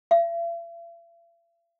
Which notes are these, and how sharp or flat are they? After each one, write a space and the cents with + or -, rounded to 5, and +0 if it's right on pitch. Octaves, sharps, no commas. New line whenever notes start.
E5 +45